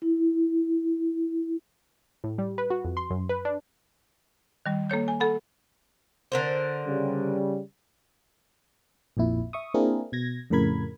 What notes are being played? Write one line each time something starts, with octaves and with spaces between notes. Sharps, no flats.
E4
A2
G3
B4
F#4
F2
C6
F#2
B4
D4
D#3 G3
A#3 A4 C#5 G6
G#5
A4 F#5 B5
D3 A#4 C5
C#3 G3
A#1 F2 A#2 E4
E5 C#6 D#6
A#3 C4 D4 E4 G#4 A#4
B2 G#6 A#6
F2 A2 C#3 A#4 B5 G#6